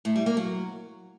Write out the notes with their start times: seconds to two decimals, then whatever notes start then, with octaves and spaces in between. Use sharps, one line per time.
0.05 A2
0.16 G3
0.26 A#3
0.37 F#3